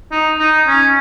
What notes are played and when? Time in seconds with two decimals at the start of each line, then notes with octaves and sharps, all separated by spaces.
0.12 D#4
0.39 D#4
0.67 C#4